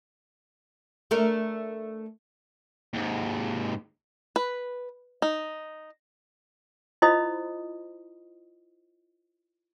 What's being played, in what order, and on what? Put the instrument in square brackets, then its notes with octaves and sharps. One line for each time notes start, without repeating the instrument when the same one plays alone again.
[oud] A3 D4 A#4
[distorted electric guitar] D#2 G#2
[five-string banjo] B4
D#4
[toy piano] E4 F4 C5 D#5 B5 D#6